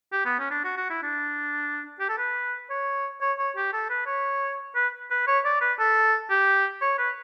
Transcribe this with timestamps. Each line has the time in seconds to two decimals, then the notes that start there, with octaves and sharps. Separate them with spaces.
0.12 G4
0.25 B3
0.39 C#4
0.51 D4
0.64 F#4
0.77 F#4
0.90 E4
1.03 D4
2.00 G4
2.09 A4
2.18 B4
2.70 C#5
3.21 C#5
3.39 C#5
3.56 G4
3.73 A4
3.90 B4
4.07 C#5
4.75 B4
5.11 B4
5.27 C#5
5.45 D5
5.61 B4
5.79 A4
6.30 G4
6.82 C#5
6.98 B4